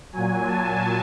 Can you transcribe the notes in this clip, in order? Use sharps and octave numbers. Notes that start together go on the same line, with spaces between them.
A#2 F#3 G#5
A5